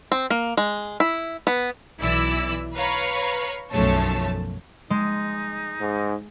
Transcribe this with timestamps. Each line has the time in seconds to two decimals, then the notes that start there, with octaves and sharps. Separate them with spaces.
0.12 C4
0.30 A#3
0.57 G#3
1.00 E4
1.47 B3
1.99 B1 E3 E4 D5 E6
2.75 B4 C#5 F5 A#5 B5 C#6
3.72 B1 F#2 F3 A3 C#5 A5
4.90 G#3 D#4
5.80 G#2